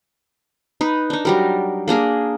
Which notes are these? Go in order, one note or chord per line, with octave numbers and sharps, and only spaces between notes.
D#4 B4
D4 D#4
F#3 G3 A#4
A#3 D4 G#4 A#4